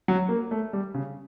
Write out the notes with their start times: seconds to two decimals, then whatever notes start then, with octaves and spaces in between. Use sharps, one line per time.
0.08 F#3
0.29 A#3
0.51 A3
0.73 G3
0.94 C#3